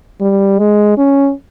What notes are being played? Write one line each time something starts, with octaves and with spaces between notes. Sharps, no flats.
G3
G#3
C#4